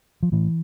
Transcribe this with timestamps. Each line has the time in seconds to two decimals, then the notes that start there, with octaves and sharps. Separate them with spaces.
0.23 F3
0.32 A2 E3